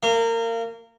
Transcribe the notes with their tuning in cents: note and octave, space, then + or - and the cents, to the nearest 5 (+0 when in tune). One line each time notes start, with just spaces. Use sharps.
A#3 -25